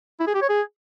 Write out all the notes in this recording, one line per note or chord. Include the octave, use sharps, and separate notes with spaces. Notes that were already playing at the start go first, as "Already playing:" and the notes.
E4
G#4
G4
C#5
G#4